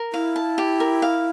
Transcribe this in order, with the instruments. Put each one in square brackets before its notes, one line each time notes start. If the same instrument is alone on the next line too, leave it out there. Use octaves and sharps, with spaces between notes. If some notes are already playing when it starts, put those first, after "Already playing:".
Already playing: [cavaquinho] A#4
[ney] E4 [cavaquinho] F5
[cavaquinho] A5
G4
A#4
F5